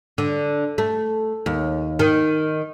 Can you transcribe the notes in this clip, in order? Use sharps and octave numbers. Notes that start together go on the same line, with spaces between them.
D3
A3
D#2
D#3